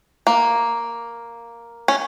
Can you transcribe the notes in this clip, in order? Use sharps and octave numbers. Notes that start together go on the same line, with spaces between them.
A#3
C#4